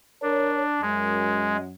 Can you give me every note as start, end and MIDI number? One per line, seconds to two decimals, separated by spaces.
0.22 0.81 62
0.22 0.63 70
0.22 0.63 73
0.82 1.72 42
0.82 1.57 56